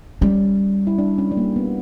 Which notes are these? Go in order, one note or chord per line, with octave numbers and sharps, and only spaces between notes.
G3 C#4
E4
D4
C#4
G3
A#3
B3